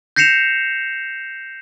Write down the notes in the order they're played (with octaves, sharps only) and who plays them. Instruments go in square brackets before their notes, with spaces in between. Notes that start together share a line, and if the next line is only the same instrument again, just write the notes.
[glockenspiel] G6 A#6 C7 C#7 E7 F7